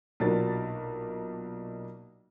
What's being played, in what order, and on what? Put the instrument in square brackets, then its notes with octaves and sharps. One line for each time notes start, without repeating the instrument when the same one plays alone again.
[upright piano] B1 A#2 D4 F#4 A#4 A6